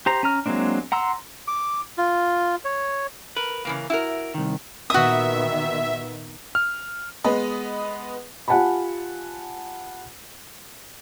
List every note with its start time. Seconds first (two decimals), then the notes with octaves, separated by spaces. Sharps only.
0.06 G4 C5 A#5
0.23 C#4 A#5 F6
0.46 F#3 G#3 A#3 C4 D4
0.92 F#5 A#5 C6 E6
1.48 D6
1.98 F4
2.65 C#5
3.36 A#4 B4
3.65 C#3 E3 A#3
3.90 E4 F#4 A#4
4.34 C2 D#3
4.90 A#2 D#3 B3 F#4 E5 D#6
6.55 F6
7.24 G#3 B3 B4 D#5
8.48 F4 G4 F#5 G#5 A5 B5